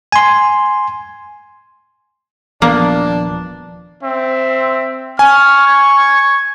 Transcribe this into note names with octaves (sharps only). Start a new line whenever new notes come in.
G#5 C6
D#1 F3 A#3 B3 D4
C4 E5
G#5 C#6 F6
G#6